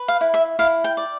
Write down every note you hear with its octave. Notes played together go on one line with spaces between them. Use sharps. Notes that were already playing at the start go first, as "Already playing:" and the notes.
Already playing: B4
F5
E4
E5
E4 F5
G5
D5